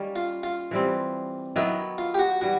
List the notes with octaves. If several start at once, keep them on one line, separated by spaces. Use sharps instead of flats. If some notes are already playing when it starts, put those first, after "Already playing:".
Already playing: D#3 G3 A#3 C#4
F4
F4
E3 G3 C4
D#3 F#3 B3 E4
F4
G4
F#4
E3 G3 F#4